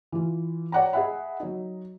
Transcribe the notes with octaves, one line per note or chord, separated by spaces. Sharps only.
E3 F4
C#5 D5 F#5 G5 A#5
G#4 D#5 E5 F#5 B5
F#3 D#4